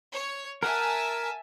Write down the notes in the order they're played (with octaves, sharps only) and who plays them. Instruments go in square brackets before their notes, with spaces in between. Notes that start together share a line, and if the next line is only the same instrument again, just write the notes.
[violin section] C#5
[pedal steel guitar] A#4 F#5 [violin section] E5 G#5 A5